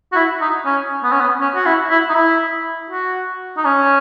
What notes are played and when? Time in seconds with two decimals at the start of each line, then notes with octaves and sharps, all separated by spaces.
0.12 F#4
0.16 E4
0.41 D#4
0.65 C#4
1.04 B3
1.12 C#4
1.20 B3
1.41 C#4
1.55 F#4
1.66 E4
1.91 E4
2.09 D#4
2.15 E4
2.90 F#4
3.57 D#4
3.65 C#4